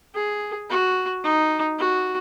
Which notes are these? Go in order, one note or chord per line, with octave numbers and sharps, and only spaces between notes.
G#4
F#4
D#4
F#4